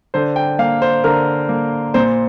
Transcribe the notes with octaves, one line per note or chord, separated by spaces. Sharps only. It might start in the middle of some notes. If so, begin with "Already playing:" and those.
D3 C5
G5
A#3 F5
C5
D3 A#4
A#3
A#2 C5